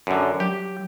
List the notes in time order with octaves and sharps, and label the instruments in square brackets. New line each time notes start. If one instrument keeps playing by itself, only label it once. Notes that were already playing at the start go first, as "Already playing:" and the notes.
[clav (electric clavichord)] F#2 D3
[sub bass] F#3 [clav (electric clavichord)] G4